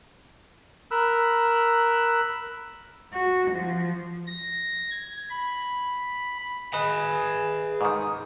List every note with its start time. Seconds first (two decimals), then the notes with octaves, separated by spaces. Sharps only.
0.91 A#4 B5 E6 F#6
3.14 F#4
3.52 F3
4.27 A#6
4.91 G#6
5.30 B5
6.73 G#4 B4 D#5 G#5 B5
7.81 G#2 D#3 D#6